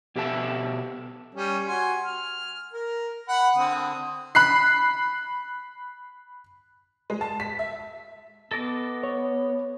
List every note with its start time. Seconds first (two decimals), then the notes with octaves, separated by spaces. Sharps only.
0.16 B2 G4 A4 B4 E5 A5
1.35 G3 C#4
1.67 F#4 G#5 C6
2.05 F6
2.73 A#4
3.28 F#5 B5
3.56 D3 C4 D#6
4.35 B5 F#6 C7
7.10 G#3
7.21 A5
7.40 B6
7.59 E5
8.51 B3 A4 D#5 D6
9.03 C#5